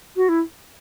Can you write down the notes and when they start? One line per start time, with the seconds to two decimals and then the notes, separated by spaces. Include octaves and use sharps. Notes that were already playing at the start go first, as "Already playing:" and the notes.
0.16 F#4
0.29 E4